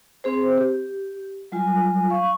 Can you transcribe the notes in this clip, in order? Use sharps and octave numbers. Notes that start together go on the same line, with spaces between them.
C4 G#4 C5
G4
F#3 G3 F4 G#5
F5 C#6